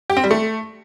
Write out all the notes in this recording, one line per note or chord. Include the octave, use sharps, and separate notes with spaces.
G4
C4
G3
A3